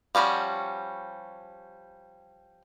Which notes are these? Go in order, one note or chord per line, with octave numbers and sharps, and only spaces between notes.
F3 G3 C#4 F4 F#4